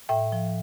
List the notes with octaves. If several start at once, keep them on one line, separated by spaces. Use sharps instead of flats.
A2 E5 G5
F3